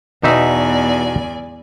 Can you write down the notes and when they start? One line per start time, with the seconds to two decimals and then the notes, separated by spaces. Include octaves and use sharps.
0.23 E2 B2 D#4 D5 E5 G#5